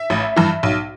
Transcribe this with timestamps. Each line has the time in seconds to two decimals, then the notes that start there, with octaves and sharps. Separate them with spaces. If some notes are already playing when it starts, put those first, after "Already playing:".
Already playing: E5
0.10 A1
0.36 G2 E3
0.63 B1